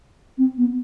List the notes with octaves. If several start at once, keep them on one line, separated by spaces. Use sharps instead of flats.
C4
B3